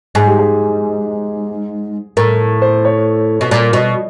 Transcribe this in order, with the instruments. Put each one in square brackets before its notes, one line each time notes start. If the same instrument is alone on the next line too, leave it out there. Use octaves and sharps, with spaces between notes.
[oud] G#2 [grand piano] G#4
[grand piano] G4
G#4
[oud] A2 [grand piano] A#4
[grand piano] C5
C#5
[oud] B2
[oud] A#2 [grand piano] D5
[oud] B2 [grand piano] D#5